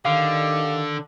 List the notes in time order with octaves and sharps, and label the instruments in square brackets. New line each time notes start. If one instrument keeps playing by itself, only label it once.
[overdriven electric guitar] D3 [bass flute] D#3 [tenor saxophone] G4 [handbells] F5